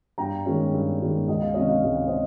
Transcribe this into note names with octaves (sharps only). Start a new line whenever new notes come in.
G2 G5 A#5
D#3 G#3 C#4
G2
D#3 G#3 C#4
C#2 D#5
F5
C3 D#3 G#3 C#4 D#5
F5
C#2 D#5
F5
C#4 C5 D#5